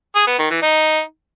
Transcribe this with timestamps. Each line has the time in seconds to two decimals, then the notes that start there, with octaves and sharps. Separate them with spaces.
0.15 G#4
0.27 B3
0.39 D#3
0.50 E3
0.62 D#4